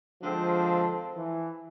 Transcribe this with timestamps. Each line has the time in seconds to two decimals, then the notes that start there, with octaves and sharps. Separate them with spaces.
0.22 D3 F3 G#3 C4 F4 A4
1.16 E3